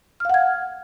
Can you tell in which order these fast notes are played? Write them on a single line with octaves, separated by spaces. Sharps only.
F6 F5 F#5 G#6